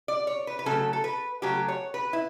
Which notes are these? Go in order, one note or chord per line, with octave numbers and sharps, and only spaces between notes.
D5
C#5
B4
B4
C#3 F#3 A3 A4
A4
B4
C#3 F#3 A3 G4
C#5
B4
E4